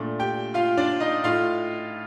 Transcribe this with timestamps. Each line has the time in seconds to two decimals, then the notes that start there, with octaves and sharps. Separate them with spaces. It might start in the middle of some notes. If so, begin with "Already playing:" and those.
Already playing: A#2 A3 D4
0.19 G4 G5
0.54 F4 F5
0.77 D4 D5
1.00 D#4 D#5
1.24 A2 A3 D#4 F4 F5